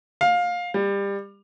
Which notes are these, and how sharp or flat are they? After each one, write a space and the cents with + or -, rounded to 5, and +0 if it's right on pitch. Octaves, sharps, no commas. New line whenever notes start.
F5 +20
G3 +25